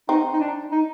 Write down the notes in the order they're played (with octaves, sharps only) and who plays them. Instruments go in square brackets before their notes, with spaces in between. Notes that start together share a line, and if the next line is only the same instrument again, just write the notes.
[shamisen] C4 [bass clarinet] D#4
[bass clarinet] D#4
D4
D#4